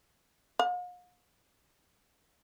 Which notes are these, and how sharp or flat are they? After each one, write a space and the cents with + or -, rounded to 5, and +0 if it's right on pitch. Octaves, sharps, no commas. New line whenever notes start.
F5 +45